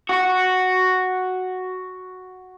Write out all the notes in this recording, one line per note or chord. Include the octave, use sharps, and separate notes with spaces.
F#4